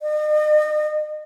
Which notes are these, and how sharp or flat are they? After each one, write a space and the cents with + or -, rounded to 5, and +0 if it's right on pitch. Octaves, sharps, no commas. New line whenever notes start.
D#5 -40